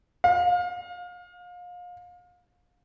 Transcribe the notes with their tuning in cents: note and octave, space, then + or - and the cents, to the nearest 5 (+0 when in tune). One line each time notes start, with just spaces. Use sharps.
F5 +30